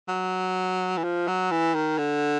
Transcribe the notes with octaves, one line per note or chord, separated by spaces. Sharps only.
F#3
E3
F3
F#3
E3
D#3
D3